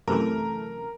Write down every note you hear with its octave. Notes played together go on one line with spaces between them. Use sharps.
F#2 C3 E3 A3 A#4